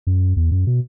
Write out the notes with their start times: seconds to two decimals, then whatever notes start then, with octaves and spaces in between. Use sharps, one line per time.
0.07 F#2
0.37 E2
0.51 F#2
0.67 B2